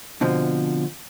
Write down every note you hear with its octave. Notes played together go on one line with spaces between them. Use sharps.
B2 D3 F3 C4